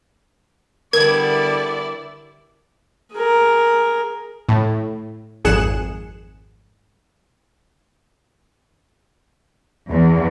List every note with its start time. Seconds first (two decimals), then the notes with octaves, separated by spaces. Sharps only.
0.93 D3 G3 B3 E4 A#4 D5 G#6
3.13 G#4 A#4
4.49 A2
5.44 G#1 F2 G#4 F#6 C#7 E7
9.90 E2